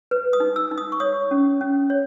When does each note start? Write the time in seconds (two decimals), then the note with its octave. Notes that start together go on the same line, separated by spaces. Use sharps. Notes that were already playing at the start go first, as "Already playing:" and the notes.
0.11 B4
0.33 D#6
0.40 D#4
0.56 E6
0.71 D#4
0.78 D#6
0.92 C#6
1.00 C#5 D#6
1.31 C#4
1.61 C#4
1.90 C#5